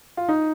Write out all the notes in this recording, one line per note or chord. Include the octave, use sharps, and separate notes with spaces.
F4
D#4